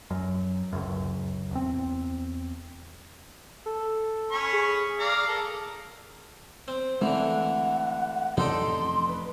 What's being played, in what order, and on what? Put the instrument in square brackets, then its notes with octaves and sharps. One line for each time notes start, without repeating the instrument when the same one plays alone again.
[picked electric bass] F#2
D1 C#2 F#2
E2 C4
[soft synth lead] A4
[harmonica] C#4 B5 C#6
[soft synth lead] G#4
[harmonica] D5 F5 A#5
A4 A#4
[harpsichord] C4
[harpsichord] D3 E3 [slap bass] G#3 A3 C4 [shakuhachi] F#5
[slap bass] A1 F2 C3 [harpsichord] D#4 A4 D5 [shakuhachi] C6
[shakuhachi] B4